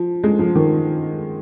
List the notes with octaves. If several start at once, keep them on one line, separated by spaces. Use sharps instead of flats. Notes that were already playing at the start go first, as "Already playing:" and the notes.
Already playing: F3
G#3
F3
D#3